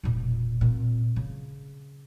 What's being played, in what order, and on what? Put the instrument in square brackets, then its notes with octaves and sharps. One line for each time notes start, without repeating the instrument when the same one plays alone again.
[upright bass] E1 A#2
A#2 C4
C#3